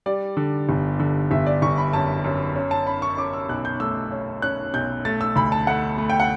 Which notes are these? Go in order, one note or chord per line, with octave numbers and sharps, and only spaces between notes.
G3 D5
D3
G1
D3
G1 E5
D5
G1 C#6
B5
F#2 A5
F#2
C#4
A5
C#4 B5
C#6
C#4 D6
E6
B1 F#6
G6
A3 E6
C#4
C#4 F#6
B1 G6
A3 A6
E6
D2 B5
A5
A3 F#5
A3
G5
F#5